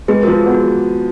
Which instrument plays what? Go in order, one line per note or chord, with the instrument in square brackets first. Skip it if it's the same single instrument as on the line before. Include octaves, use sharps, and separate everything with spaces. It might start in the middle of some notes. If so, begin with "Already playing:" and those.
[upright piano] G#3 [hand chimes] G#4 B4
[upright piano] F3 [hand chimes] F#4 A#4
[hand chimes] G#4
[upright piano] B3
[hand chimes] F#4